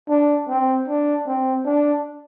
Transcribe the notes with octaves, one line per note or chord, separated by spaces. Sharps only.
D4
C4
D4
C4
D4